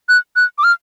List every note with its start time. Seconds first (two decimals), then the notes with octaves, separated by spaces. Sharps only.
0.09 F#6
0.36 F#6
0.58 D6
0.64 F6